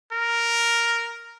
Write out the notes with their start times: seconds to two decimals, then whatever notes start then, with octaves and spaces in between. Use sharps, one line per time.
0.12 A#4